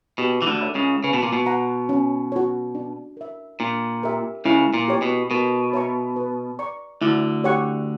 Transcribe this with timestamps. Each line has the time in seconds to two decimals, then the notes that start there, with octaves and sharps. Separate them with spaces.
0.18 B2 G4
0.42 E3
0.47 D2 D3
0.61 A#4 C#5 E5 B5
0.75 C#2 C#3
1.04 C#3 B4
1.13 B2
1.23 A#2
1.33 B2
1.46 F#5 A#5
1.89 C#4
2.32 F#4 C#5
2.75 D4
3.17 A#4 E5
3.60 A#2 D4
4.03 G4 A#4 E5
4.45 C#2 C#3 E4
4.74 A#2
4.88 G4 C#5
5.02 B2
5.31 B2 A#4
5.73 C#5 E5 A#5 C#6
6.16 B4
6.59 D5 A#5 C#6
7.01 D2 D3 E4
7.44 G4 C#5 F#5 C#6